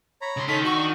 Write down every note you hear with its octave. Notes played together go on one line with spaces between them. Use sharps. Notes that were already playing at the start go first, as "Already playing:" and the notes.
C#5 A#5 B5
C#3 C6
D#3 A4 C#5 D#6 B6
F#4 C#6 E6
D4